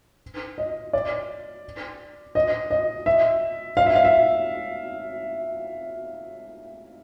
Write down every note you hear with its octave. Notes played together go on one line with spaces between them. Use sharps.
D#5
D5
D#5
D#5
E5
F5
E5
F5
E5